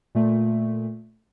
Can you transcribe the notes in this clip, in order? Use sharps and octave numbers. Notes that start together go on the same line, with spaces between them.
A#2 A3